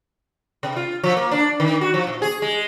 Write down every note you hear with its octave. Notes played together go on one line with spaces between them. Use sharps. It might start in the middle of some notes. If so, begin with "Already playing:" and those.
C3
F4
F3
A#3
D4
D#3
F#4
F3
A#2
G#4
G#3